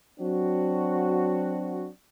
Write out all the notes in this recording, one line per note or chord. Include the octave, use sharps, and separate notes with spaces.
F#3 C4 D4 F#4